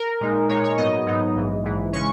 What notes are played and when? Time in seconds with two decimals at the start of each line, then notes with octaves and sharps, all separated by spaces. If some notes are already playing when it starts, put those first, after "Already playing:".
Already playing: A#4
0.21 A#2 G#3 D#4
0.49 A#2 G#3 D#4 C#5
0.64 C#5
0.77 G#2 F#3 B3 D#4 D#5
1.06 G#2 F#3 B3 D#4
1.35 A#1 G#2 E3
1.63 A#1 G#2 E3
1.93 C#3 G#3 C#4 C#6